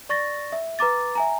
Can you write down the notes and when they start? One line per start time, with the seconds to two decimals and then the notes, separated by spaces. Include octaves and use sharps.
0.09 D5 C#6 A6 A#6
0.52 E5
0.79 B4 A#5 D6 A6
1.15 E5 G#5 A#5